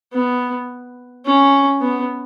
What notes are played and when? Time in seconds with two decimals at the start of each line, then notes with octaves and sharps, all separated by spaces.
0.13 B3
1.25 C#4
1.81 B3